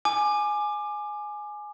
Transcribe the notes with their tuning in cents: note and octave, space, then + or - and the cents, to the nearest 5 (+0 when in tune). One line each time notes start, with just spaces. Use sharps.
G#5 +10 D6 +25